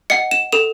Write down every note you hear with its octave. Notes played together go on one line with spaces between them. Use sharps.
D#5 F#5 C#7
E7
A4 E7